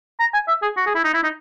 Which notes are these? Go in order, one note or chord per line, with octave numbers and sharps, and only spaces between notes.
A#5
G#5
E5
G#4
F#4
G#4
E4
D#4
E4
D#4